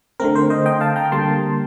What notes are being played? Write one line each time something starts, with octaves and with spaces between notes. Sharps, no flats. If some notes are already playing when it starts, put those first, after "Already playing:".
D3 A3 C4 A#4
C5
C5 D#5
D#5 G5
F5 A5
G5 A#5
D3 G3 A#3 A5 C6